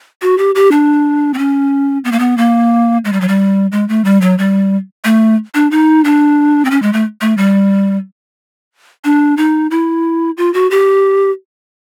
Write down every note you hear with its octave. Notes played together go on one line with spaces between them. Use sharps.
F#4
G4
G4
D4
C4
C#4
B3
A#3
B3
A#3
G#3
G3
F#3
G3
G#3
A3
G3
F#3
G3
A3
D4
D#4
D4
C4
C#4
G#3
A3
A3
G3
D4
D#4
E4
F4
F#4
G4